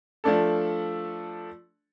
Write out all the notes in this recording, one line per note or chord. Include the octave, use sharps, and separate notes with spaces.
F3 A3 D4 A4